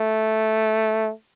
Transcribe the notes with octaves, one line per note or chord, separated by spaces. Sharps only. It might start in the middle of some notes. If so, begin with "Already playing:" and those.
Already playing: A3